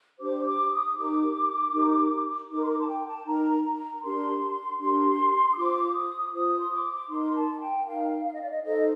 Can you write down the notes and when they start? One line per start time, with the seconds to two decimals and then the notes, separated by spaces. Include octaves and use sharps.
0.20 D4 G4 C5 D6
0.44 D6
0.71 D#6
0.96 D#4 G4 A#4 D6
1.72 D#4 G4 A#4
2.49 D#4 A#4 D6
2.62 C6
2.69 D6
2.80 A5
2.87 G5
3.08 A5
3.26 D#4 A#4 A#5
3.65 A#5
4.03 D4 G4 A#4 C6
4.79 D4 G4 A#4 C6
5.52 D#6
5.56 F4 C5 D6
5.95 D#6
6.33 F4 C5 D#6
6.60 C6
6.71 D6
7.09 D#4 A#4 C6
7.36 A5
7.61 G5
7.86 D#4 A#4 F5
8.24 F5
8.33 D#5
8.41 D5
8.50 D#5
8.63 D#4 A4 C5 D#5